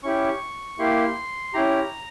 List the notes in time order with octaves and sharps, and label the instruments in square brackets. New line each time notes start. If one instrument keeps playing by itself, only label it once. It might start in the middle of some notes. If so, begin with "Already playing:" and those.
[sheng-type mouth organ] C#4 E4 G4 C#6
A#3 E4 G4 C6
C#4 E4 G4 A#5